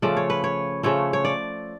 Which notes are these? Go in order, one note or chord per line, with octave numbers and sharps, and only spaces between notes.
C#3 F3 A3 D5
C#5
B4
C#5
C#3 F3 A3 C#5
C#5
D5